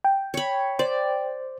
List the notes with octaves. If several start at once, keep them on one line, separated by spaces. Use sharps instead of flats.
G5
C#5 B5
C5 D5